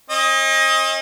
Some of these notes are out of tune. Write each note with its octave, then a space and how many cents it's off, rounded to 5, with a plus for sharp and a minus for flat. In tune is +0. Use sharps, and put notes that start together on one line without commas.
C#4 -45 D#5 +20